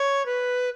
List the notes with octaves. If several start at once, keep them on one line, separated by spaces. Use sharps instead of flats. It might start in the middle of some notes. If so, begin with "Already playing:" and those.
Already playing: C#5
B4